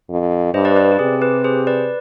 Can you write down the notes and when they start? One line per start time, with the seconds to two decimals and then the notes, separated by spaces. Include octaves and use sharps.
0.10 F2
0.54 G2 C5 D#5
0.65 B4 D5
0.76 B4 D5
0.92 G4
0.99 C3 G#4
1.21 G4 B4
1.44 G#4 C5
1.67 B4 D5